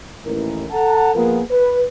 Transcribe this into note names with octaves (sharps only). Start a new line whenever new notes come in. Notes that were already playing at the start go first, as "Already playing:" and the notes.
A1 D#2 E3 A#4
A4 F#5 A5 A#5
F3 A#3 B3 F4 G#4 A#4
B4